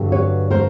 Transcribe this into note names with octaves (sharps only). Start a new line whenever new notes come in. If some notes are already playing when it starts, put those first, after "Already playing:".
Already playing: G2 D3 F#3 B3
B4 C#5
A#4 C5